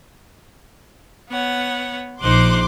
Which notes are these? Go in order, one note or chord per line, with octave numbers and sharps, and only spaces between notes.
B3 C#5 F#5
A#1 D#4 C5 C6 D6 F#6